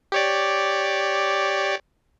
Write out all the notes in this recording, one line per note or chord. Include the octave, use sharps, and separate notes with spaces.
G4 C#5 D5